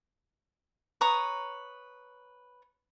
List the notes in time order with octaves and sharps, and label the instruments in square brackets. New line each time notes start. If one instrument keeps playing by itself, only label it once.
[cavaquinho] B4 C#5 A#5 D#6